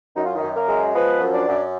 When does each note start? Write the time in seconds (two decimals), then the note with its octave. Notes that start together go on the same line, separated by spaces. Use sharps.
0.16 F#2 D#4
0.25 F4
0.35 D#3 D#4
0.42 F#2
0.55 A#3 A#4
0.68 G#3
0.94 F3 B3 B4
1.20 F#2
1.33 D4 D5
1.47 F#2